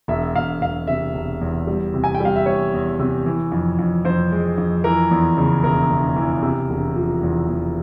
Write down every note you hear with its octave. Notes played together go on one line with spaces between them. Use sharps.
E1 E5
E1 F5
E1 F5
C3 E5
E1
E2
G3
C3
G#5
G5
G3 F5
E5
E2 C#5
E2
C3
E3
F2
F2
F2 C5
G#3
F2
E3 A#4
E2
C#3
E1 A#4
E1
E3
C3
E1
F3
E2
E2